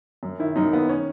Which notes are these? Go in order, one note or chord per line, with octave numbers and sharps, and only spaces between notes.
F#2
D#3 E4
F#2 D#4
D#3 B3
C#4